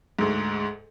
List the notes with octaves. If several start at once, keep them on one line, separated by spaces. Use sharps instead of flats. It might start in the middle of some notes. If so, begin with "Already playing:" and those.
D2 G#2